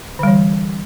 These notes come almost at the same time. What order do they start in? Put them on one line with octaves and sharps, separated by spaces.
D3 G3 E3